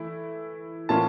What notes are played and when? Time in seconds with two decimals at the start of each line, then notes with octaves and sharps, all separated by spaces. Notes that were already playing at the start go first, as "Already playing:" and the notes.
Already playing: E3 A3 E4
0.89 A2 E3 A#3 C#4 F4 A5